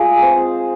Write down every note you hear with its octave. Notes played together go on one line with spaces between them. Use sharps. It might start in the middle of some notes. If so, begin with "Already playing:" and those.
Already playing: G#3 F4 G#4
C4